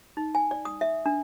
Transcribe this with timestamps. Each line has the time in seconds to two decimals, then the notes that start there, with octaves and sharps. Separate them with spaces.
0.17 D#4
0.35 G#5
0.51 D5
0.65 D#6
0.81 E5
1.06 D4